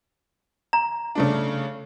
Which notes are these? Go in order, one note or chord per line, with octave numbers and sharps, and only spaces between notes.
A#5
C#3 A3 D4